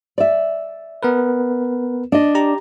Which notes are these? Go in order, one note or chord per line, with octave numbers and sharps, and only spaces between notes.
D5 E5
B3 A#4 B4
D4 D#5
G4 A#5